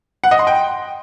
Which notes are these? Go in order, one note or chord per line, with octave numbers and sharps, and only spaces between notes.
F#5
D#5
C6
G5